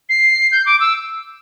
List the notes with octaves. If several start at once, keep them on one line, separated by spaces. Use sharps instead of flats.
C7
G6
D6
E6